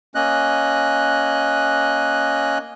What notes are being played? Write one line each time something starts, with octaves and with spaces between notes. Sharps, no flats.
A#3 C#4 D#5 F#6